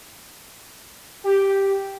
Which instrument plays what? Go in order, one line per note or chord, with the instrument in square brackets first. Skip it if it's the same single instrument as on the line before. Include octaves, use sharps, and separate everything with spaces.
[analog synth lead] G4